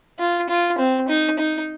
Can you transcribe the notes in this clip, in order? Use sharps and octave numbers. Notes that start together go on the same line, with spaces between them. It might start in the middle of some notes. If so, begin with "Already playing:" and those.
F4
F4
C4
D#4
D#4